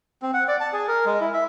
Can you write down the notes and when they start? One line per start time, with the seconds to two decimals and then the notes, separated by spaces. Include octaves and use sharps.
0.22 C4
0.34 F#5
0.48 D5
0.60 A5
0.73 G#4
0.88 A#4
1.05 G#3
1.20 E4
1.34 E5